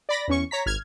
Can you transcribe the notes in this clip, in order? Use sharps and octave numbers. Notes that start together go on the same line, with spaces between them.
D5 B5 A#6
E2 C#4 C#6
C#5 A#5 B6
G#1 F6 G#6